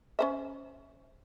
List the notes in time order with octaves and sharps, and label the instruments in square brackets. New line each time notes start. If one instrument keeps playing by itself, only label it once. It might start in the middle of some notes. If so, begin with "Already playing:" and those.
[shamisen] C#4 C5 E5